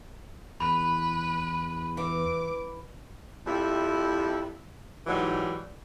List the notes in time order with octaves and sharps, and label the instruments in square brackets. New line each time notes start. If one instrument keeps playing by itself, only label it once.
[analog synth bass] E2 [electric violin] B4 [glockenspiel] B5
[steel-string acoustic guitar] E3 [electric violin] D6
[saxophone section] F2 G3 E4
G#2 E3 F#3 G3 D#4